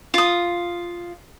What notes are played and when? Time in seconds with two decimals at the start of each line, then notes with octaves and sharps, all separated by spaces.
0.14 F4 D#6